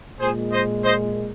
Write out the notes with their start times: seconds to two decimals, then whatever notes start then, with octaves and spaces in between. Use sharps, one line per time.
0.20 A#2 G#3 G#4 C5
0.52 C5 D#5
0.84 C5 D#5